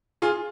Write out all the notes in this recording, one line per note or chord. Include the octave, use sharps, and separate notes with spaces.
F4 G#4